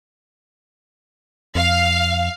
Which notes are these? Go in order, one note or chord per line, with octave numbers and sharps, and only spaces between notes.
F2 F5